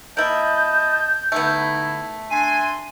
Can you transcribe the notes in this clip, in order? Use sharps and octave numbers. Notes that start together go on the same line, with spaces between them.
A#3 E4 D#5 A5 G6
D3 A3 B3 D#4 E4
D4 E5 G#5 C6 D#7